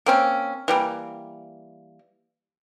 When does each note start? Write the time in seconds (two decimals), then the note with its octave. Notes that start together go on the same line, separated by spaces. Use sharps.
0.06 A#3 C4 C#4
0.68 E3 G3 A#3